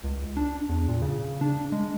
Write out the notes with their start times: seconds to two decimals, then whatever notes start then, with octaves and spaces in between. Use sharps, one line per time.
0.04 C#2
0.37 D4
0.69 E2
0.88 A#2
1.02 C#3
1.41 D4
1.72 G#3